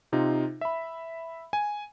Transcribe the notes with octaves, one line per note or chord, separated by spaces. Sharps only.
C3 D#4 F4
E5 B5
G#5